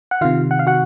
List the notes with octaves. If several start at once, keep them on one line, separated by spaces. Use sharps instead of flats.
F#5
C3 D#3 F4 F5
F#5
F5
F#4 F#5